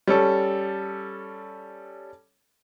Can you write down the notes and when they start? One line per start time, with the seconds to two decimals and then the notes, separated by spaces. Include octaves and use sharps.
0.07 G3 C#4 A4